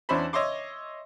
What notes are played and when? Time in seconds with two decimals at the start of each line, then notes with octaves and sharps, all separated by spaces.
0.09 E2 C#4 D4 E4 C5 B5
0.33 C#5 D#5 E5 C6 D6